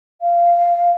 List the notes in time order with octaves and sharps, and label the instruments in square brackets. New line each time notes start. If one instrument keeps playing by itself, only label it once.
[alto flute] F5